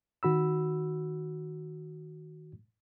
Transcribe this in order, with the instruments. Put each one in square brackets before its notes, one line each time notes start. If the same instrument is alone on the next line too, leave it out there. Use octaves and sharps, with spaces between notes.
[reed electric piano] D#3 F#4 B5 E6